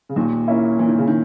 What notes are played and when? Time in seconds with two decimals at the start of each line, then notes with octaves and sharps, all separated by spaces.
0.09 C#3
0.16 D#2 A#2 D#3
0.48 A#3 C#4 E4
0.79 A#2 E3
0.88 D#3
0.98 C#3
1.07 D#3